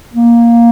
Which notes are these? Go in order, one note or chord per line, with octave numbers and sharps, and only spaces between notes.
A#3